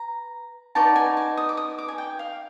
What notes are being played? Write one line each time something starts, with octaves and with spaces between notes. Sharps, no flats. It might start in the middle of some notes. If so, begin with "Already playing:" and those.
Already playing: B4 A#5
D#4 F#4 B4 D5 A5
G#5
A5
D#6
D6
D#6
D6
G#5
G5
F5